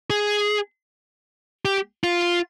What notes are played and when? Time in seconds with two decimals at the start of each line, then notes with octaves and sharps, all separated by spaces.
0.10 G#4
1.65 G4
2.04 F4